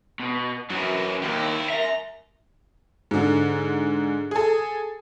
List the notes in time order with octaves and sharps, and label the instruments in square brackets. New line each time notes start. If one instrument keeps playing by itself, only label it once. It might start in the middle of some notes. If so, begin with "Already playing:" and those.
[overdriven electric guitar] B2
[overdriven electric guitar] F#2 [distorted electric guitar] E3 F#3
[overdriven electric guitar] D#2 [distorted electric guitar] G3 E4
[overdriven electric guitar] A#4 E5 [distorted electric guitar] A#5
[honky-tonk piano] G#2 D3
G#4 A4